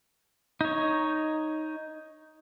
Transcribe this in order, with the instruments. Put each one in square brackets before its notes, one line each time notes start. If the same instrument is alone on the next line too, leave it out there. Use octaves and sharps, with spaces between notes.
[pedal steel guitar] D#4 C#5